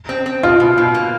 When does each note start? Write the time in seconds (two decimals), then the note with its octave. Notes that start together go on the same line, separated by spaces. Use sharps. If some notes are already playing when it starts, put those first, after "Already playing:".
0.09 C4
0.26 C4
0.43 B2 F4
0.60 B2
0.78 B2
0.94 A#3